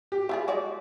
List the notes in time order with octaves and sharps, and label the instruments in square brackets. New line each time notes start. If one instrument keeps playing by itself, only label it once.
[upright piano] G4
[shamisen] E4 F4 G#4
G#3 F#4 D5